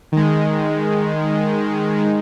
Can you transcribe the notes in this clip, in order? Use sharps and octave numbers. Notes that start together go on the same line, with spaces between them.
D#3 G#3